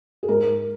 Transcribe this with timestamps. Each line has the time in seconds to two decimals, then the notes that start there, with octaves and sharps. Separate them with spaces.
0.23 G#4
0.28 G#2 A#4